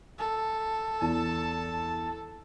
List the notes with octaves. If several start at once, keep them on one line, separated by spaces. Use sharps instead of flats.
A4
E2 A5